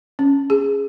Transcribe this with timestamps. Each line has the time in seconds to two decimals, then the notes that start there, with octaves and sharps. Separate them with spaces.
0.19 C#4
0.50 G#4